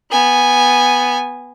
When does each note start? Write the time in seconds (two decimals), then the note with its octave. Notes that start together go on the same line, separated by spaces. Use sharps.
0.11 B3 G#5